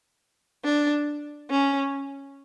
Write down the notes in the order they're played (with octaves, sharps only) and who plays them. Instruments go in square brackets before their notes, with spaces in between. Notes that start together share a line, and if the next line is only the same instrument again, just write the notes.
[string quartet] D4
C#4